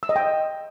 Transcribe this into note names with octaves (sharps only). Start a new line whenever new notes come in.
E6
D#5
G5